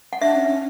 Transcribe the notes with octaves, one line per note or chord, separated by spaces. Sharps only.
F#5
D4 E5
C#4
C#4